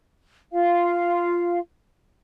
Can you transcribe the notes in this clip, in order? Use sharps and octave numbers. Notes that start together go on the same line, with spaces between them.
F4 F5